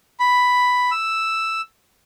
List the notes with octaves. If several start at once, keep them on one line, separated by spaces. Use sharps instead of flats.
B5
E6